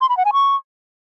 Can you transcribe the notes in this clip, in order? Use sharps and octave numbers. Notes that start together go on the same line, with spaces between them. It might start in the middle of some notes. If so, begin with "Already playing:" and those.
C6
B5
F#5
G#5
C#6